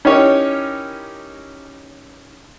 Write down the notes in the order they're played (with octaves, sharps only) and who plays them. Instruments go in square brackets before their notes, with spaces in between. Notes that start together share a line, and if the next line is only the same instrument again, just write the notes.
[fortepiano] C#4 D#4 E4 G4 A#4 C#5